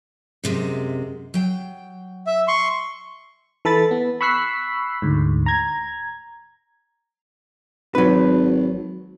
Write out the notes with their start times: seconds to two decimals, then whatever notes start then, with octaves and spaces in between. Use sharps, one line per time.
0.44 F#2 C3 G#3
1.34 F#3 G5
2.27 E5
2.48 C6 C#6
3.65 E3 A4 B5 A6
3.91 B3
4.21 B5 C#6 E6 F#6 B6 C7
5.02 D2 G#2
5.46 A#5 G#6
7.95 G#1 F#3 B4